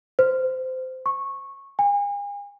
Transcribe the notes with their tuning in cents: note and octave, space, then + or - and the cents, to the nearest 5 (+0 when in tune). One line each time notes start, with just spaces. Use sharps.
C5 -20
C#6 -15
G#5 -40